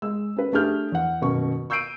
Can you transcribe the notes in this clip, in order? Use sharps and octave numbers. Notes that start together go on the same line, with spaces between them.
G#3 E6
C#4 B4
A3 D4 G4 G#4 F6 G6
E2 F#5
D#1 F#2 B2 C#6
C#6 E6 G6 C7 D7 D#7